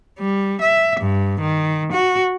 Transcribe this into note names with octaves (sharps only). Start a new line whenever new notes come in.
G3
E5
G2
D#3
F#4